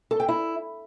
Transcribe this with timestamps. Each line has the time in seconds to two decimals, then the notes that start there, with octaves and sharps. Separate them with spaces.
0.11 A4
0.20 G5
0.29 E4